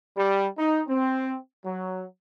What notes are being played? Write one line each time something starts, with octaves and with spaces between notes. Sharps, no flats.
G3
D#4
C4
F#3